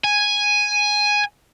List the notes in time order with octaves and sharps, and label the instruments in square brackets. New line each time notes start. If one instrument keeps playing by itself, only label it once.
[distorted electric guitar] G#5